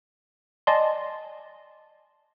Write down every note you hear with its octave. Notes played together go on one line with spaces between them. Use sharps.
D5 D#5 G#5 A5 C6